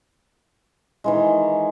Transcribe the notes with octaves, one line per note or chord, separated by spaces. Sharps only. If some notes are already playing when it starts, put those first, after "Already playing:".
D#3 E3 G#3